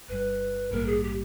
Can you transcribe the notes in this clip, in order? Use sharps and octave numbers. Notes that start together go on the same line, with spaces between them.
G1 G2 G3 B4
A#1 G#2 G3 A#3 A#4
G#4
G4